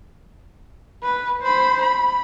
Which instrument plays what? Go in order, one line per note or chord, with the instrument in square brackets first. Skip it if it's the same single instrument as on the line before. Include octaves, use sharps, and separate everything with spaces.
[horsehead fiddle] B4
C5 B5
B5